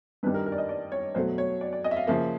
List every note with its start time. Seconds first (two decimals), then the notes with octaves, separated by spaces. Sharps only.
0.23 G2 D#3 G3 B4
0.34 A#4
0.46 A#4
0.52 D5
0.58 D#5
0.69 D5
0.92 C#5
1.15 B2 F#3 A3 C5
1.38 C#5
1.61 D5
1.73 D5
1.84 D#5
1.91 E5
1.97 F5
2.07 C#3 F3 A#3 E5